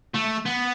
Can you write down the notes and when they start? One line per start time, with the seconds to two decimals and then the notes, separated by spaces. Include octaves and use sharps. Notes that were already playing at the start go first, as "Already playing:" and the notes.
0.15 A3
0.46 B3